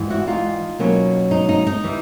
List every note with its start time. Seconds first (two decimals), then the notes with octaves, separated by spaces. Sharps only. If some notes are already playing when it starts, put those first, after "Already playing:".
Already playing: G#2 E3 G3
0.10 E4 F#4
0.27 D#4 F4
0.79 B2 F#3 A#3 C#4
1.31 D#4
1.49 D#4
1.67 D#4
1.84 E3 G3